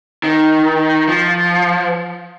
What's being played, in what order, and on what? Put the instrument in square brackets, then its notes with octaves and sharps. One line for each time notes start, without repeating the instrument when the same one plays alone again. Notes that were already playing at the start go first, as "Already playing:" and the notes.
[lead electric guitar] D#3
F3